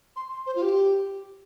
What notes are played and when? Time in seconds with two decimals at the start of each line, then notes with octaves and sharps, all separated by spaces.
0.16 C6
0.31 C6
0.46 C5
0.56 F4
0.62 G4